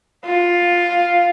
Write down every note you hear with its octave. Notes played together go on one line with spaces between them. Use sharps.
F4